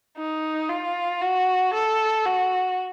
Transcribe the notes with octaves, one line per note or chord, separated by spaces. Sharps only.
D#4
F4
F#4
A4
F#4